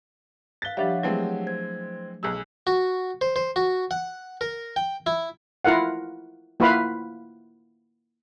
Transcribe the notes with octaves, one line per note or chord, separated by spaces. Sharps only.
F5 F#6 A6 B6 G7
F3 G3 D4 G4 C#5 E5 F#5
E3 F#3 G#3 A3 C4
C5 G#6
B1 G#4 E6
F#4
C5
C5
F#4
F#5
A#4
G5
E4
E4 F4 A#4 F5 F#5
A#3 E4 F4 B4 F5 B5